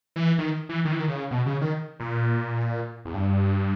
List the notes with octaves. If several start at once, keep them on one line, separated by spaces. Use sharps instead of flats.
E3
D#3
E3
D#3
E3
D#3
C#3
B2
C#3
D#3
A#2
E2
G2